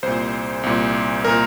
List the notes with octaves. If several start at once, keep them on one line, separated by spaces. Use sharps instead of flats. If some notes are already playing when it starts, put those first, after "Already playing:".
C2 A#2 C5
C2 A#2
A#4
A#2